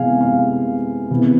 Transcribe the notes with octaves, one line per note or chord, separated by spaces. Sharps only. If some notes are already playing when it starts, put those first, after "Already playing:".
Already playing: C3 E3 G#3 B3 F5 G#5
F5
C3 E3 B3